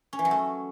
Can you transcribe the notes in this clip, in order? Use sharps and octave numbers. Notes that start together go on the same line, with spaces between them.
C#4
E3
F#3
A3